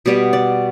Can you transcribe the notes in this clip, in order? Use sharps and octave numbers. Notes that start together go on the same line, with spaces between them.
B2 G3 B3
D5